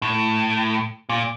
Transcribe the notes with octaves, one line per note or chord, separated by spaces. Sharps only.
A2
A#2